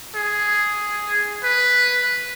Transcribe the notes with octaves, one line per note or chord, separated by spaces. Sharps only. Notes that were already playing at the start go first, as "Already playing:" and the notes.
G#4
B4